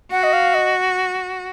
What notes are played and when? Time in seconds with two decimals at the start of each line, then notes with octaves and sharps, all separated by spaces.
0.11 F#4 F#5
0.24 D#5
0.33 F5
0.54 D#5